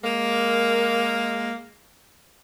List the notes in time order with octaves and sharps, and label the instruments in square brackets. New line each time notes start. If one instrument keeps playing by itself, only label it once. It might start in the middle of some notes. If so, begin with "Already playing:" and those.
[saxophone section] G#3 A#3